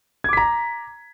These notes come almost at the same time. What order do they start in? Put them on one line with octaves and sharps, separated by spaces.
G#6 D6 B6 A#5